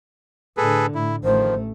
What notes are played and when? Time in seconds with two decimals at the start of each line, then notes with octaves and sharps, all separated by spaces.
0.57 A2 D3 G#4 A4 B4
0.95 A2 E4
1.24 A1 D#3 F3 A3 C5